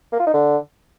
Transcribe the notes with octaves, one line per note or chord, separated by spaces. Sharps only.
A#3
F4
D#4
D3